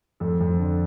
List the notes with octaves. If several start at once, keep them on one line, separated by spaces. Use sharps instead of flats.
F2 A4
F2
D3